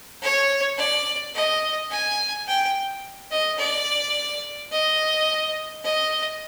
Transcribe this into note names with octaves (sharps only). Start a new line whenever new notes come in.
C#5
D5
D#5
G#5
G5
D#5
D5
D#5
D#5